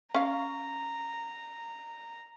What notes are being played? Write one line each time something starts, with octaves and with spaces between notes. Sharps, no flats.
C#4 F5 A#5